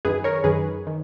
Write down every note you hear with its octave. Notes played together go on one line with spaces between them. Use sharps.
F#2 D#3 G#4 B4
A#4 C#5
F#2 D#3 G#4 B4
D#3